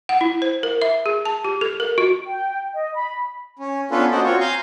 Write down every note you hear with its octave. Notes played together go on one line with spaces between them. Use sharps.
F#5
E4
C5
A#4
E5
G#4
A5
G4
A4
A#4
F#4
G5
D#5
B5
C#4
B3 C#4 D4 F4 A4 B4
A#3 C#4 F#4 C5 D5 D#5
C4 F4 F#4 C#5
F5 G#5 A#5 C6 G6